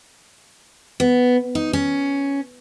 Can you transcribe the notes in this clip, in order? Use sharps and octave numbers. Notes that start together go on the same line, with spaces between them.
B3
D#4
C#4